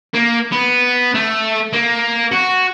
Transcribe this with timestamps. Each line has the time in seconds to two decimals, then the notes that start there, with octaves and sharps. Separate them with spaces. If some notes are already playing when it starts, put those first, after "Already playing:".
0.14 A#3
0.52 B3
1.14 A3
1.73 A#3
2.32 F#4